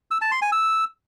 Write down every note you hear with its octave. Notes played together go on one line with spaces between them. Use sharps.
E6
A5
C6
G#5
E6